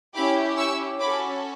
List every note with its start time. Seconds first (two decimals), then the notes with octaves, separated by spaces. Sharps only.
0.14 C#4 E4 G4 B5 D6
0.57 C#6 E6
0.99 C#4 F#4 A4 B5 D6